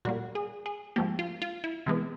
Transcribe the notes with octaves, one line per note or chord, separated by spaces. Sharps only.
A#2 G3 A#3 F#4
G#4
G#4
G#2 F3 A#3 G4
F4
F4
E4
C3 E3 G#3 B3